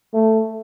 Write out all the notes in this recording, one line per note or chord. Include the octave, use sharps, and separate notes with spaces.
A3